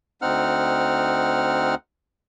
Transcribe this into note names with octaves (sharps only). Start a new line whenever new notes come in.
D2 C4 D#4 F#5 F6